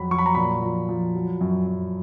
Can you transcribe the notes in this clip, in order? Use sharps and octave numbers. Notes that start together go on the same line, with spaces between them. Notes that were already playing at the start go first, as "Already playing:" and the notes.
Already playing: F2 F#3 B5
F#3 C#6
B5
A#5
A#2 B5
F3
F3
F#3
F#2
F#2